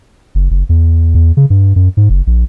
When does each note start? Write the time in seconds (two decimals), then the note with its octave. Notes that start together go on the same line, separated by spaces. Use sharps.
0.35 F#1
0.51 F#1
0.69 E2
1.15 E2
1.37 C#3
1.50 G2
1.76 F#2
1.97 G#2
2.10 F#1
2.27 A#1